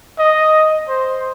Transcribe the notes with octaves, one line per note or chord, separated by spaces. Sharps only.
D#5
C5